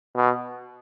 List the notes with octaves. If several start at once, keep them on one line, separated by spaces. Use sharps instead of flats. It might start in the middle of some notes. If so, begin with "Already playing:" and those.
B2